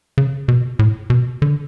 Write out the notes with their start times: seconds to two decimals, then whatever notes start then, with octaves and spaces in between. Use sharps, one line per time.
0.18 C#3
0.48 B2
0.79 A2
1.10 B2
1.42 D3